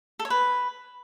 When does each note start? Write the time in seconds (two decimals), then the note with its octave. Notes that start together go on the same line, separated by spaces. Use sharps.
0.19 A4
0.25 C#5
0.30 B4